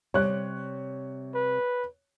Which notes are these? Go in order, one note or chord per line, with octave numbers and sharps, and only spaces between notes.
C3 G3 C#5 F#6
B4